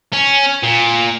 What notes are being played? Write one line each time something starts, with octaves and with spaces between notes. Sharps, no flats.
C#4
A#2